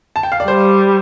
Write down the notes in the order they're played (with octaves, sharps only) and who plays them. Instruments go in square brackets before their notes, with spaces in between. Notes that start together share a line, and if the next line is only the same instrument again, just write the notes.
[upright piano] A5
G5
F5
D5
[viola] G3 [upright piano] C5